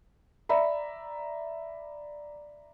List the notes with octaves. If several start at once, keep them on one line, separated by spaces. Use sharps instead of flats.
D5 E5 A#5 B5